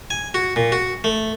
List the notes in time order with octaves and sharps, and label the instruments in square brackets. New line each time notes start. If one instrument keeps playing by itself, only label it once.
[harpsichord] G#5
F#4
A#2
F#4
A3